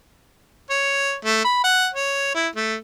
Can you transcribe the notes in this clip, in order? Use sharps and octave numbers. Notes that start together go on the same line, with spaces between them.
C#5
A3
B5
F#5
C#5
E4
A3